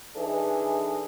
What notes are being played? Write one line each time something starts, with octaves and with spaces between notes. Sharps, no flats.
E3 D4 D#4 G#4 A4